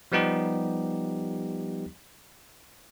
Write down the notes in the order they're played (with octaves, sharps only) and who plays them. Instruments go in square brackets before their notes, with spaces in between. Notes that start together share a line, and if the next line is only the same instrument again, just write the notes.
[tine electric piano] F3 G3 B3 D#4 G4